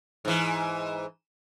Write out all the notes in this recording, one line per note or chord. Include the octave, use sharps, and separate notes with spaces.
G#2 E3